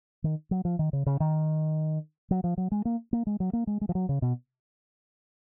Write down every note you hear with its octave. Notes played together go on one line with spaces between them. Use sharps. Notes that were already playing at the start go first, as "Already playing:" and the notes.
D#3
F#3
F3
D#3
C#3
C#3
D#3
F#3
F3
F#3
G#3
A#3
A#3
G#3
F#3
A#3
G#3
G#3
F3
F#3
C#3
B2